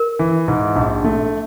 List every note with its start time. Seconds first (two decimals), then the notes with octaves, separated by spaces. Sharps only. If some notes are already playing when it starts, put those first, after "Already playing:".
Already playing: A#4
0.19 E3
0.48 G#2
0.76 A#1
1.04 A3